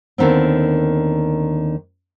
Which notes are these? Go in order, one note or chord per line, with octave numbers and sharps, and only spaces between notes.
D#2 D3 D#3 B3 C4